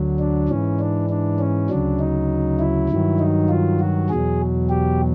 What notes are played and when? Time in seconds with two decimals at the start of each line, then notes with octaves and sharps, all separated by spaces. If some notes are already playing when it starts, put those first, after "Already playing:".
Already playing: D2 D3 F#3
0.19 D4
0.49 G#2 E3 C#4
0.80 D4
1.10 D4
1.39 C#4
1.69 D2 C#3 F#3 D4
2.00 D#4
2.60 E4
2.89 G2 D#3 F#3
3.19 D#4
3.49 F4
3.80 F#4
4.10 E2 B2 F#3 G#4
4.70 G4